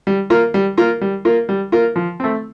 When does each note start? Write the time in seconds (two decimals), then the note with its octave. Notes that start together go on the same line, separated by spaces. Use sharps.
0.07 G3
0.30 A#3 F4 A#4
0.54 G3
0.77 A#3 F4 A#4
1.01 G3
1.25 A#3 F4 A#4
1.49 G3
1.72 A#3 F4 A#4
1.96 F3
2.20 A3 C4